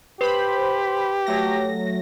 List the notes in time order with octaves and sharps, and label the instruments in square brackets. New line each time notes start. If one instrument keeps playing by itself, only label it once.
[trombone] G4 [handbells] B4 [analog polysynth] C5 B5
[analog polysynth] F#3 A3 A#6